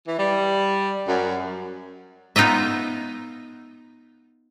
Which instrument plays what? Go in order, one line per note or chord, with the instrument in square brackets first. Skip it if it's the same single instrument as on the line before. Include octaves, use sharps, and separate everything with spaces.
[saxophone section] E3
G3
F#2
[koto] B3 D#4 F4 D#5 E5